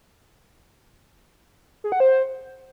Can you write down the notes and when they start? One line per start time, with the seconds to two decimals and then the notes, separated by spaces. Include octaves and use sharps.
1.84 G#4
1.92 F#5
2.00 C5